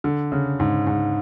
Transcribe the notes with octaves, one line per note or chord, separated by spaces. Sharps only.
D3
C#3
G#2
G#2